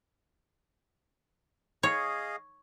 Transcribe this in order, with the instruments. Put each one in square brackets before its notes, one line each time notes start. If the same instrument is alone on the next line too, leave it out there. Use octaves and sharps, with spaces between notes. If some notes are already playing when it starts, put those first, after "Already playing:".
[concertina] G#4 D#5 F5 [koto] C#5